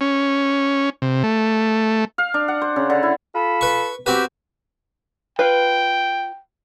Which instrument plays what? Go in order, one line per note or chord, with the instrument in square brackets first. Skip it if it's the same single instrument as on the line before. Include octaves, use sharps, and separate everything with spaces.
[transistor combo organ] C#4
C3
A3
[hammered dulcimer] F5
D4
F#5
C5
C#3
D3
E4
[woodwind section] F4 A4 B5
[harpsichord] B4 C#6
[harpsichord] C4 F#4 B4 [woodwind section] G4
[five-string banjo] F4 B4 [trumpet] G5